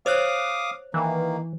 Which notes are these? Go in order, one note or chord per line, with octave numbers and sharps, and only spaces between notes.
C5 C#5 F5 D6 D#6 F#6
D#3 E3 A#3